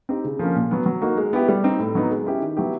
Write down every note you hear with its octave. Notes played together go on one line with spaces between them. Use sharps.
C4 D#4 G4
C#3
F3 A#3 C#4
A#2
F#3 B3
F#3
A#3 D#4 F#4
G#3
B3 E4 G4
G3
C4 D#4
A2
F#3 B3 D#4
G#3
C#4 E4 G4
D#3
F#3 B3 E4 G4